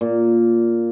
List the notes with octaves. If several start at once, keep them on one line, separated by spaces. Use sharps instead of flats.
A#2